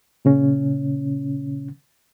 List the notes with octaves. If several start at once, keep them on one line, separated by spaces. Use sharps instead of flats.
A#2 C#3 C#4